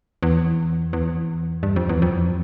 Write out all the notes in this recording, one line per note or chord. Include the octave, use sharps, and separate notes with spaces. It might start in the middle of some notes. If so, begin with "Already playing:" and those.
E2
E2
G2
F2
E2
F2